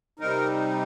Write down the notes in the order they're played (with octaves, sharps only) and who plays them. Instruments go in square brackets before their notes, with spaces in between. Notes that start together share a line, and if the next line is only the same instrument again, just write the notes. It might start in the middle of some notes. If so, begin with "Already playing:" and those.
[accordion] C3 G3 C4 D#4 A#4